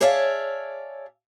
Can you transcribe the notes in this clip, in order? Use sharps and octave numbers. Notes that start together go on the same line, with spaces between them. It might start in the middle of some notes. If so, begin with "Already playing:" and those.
G#4 C#5 D5 E5 F5 A5